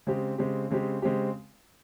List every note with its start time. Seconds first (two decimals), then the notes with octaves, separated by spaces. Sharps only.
0.07 C#3 G#3 C4 G4
0.38 C#3 G#3 C4 G4
0.70 C#3 G#3 C4 G4
1.02 C#3 G#3 C4 G4